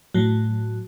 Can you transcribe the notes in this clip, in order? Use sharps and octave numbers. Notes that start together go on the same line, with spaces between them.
A2 F#3